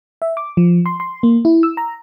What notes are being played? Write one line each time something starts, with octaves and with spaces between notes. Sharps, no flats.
E5
D6
F3
C6
C6
A#3
E4
E6
A#5